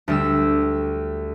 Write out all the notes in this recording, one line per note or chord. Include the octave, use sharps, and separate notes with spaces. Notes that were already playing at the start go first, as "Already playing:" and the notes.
D2 G3 E6